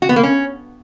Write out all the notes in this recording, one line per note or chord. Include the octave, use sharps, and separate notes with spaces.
F#4
B3
A#3
C#4